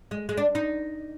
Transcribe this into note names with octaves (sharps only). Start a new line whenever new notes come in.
G#3
G#3
D4
D#4